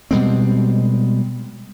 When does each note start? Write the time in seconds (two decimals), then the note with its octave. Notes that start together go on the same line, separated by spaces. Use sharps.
0.11 B2 G3 G#3 C4